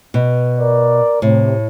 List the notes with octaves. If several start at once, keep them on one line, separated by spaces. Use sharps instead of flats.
B2
A#4 D5
A2 C3